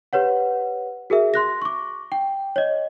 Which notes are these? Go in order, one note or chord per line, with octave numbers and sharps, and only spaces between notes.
G4 B4 C#5 F#5
F#4 G#4 A#4 E5
C6 F#6 A#6
C#6 D6
G5
C#5 D#5